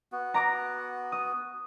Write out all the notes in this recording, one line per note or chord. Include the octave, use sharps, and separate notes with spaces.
B3 F#4
A#5 D6 A#6
D#6